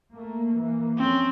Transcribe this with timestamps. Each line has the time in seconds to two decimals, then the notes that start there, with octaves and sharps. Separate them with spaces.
0.11 A3 A#3
0.58 E3 A#3
0.98 F2 C4 C#4